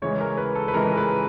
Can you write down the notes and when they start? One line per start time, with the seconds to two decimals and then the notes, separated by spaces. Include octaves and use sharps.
0.02 C#3 E3 G#3 C#5
0.20 A#4
0.38 B4
0.55 A4
0.68 B4
0.74 C#3 E3 G#3 A#4
0.97 B4